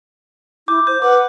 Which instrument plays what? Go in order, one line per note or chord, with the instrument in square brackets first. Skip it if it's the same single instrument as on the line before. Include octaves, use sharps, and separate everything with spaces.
[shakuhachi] E4 [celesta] D6 [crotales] G6
[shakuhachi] C5 [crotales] G6
[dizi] B4 [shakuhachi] F#5 [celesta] D6